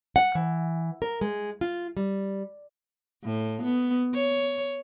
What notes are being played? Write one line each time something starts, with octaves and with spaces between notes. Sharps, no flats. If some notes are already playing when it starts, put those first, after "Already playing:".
F#5
E3
A#4
G#3
F4
G3
A2
B3
C#5